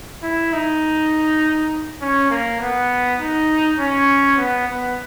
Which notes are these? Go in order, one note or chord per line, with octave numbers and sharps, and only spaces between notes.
E4
D#4
C#4
A#3
B3
D#4
C#4
B3
B3